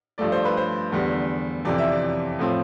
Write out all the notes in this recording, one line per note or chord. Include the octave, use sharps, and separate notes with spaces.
G2 F3 A3 D5
C5
B4
C5
E2 D3 G3 B3
F2 C3 E3 D5
E5
D5
A2 F3 C4